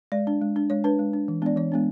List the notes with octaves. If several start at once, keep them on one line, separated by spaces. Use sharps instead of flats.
G#3 D5
D4
G#3
D4
G#3 C#5
D4 B4
G#3
D4
E3
G#3 B3 D4 D5
E3 C#5
G#3 B3 D4